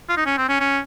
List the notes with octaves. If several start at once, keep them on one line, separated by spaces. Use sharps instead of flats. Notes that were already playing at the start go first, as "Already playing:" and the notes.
F4
D#4
C#4
C4
C#4
C#4